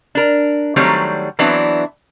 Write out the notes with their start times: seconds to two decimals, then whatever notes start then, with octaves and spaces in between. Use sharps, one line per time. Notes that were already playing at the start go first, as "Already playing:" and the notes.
0.15 D4 A#4
0.76 D#3 F#3 G3 A3 C4 C#5
1.39 E3 F#3 B3 C4 D4 E4